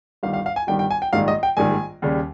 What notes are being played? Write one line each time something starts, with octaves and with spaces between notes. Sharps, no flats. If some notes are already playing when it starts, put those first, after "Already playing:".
G1 G2 D#3 G3 F5
F5
F5
G#5
G1 G2 D#3 G3 G5
G5
G#5
G5
A#1 G#2 D#3 G3 F5
D#5
G5
A#1 G#2 D#3 G3 G#5
D#2 C#3 G3